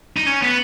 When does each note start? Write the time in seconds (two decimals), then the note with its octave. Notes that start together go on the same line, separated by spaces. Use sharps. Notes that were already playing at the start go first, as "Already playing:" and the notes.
0.16 D#4
0.26 C#4
0.42 B3